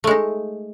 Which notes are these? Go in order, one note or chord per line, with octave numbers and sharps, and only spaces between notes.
G#3 A3 D#4